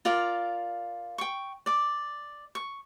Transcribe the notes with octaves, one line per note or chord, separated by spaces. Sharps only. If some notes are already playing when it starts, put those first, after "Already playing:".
F4 A#4 D5 F5
G5 C#6
D5 D6
C#6